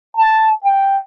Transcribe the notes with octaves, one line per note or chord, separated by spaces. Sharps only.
A5
G5